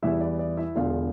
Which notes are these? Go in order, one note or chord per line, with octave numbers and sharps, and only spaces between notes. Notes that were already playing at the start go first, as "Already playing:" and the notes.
E2 E3 G3 E4 E5
D5
D5
E4 E5
E1 E2 D3 F4 F5